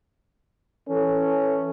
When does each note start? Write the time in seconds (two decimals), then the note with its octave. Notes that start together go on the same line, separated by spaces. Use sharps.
0.89 E3 C#4 A4